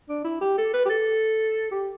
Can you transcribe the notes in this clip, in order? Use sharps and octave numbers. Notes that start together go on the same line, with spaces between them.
D4
E4
G4
A4
B4
G4
A4
G4